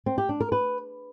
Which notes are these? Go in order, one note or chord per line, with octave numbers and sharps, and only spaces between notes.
C4
G4
D4
A#4
B4